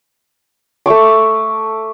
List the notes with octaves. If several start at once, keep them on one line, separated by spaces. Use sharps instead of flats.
A3 E5 C#6 D6